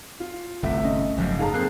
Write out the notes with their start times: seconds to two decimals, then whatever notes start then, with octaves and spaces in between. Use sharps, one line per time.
0.20 F4
0.63 G1 C2 A3 E5
0.84 C#4 D#5
1.18 F#1 G#2 C#3 F3 F#3
1.39 D#4 G#4 A4 F5 A5 A#5
1.54 F2 A#3 C4 G#4 F#6 C7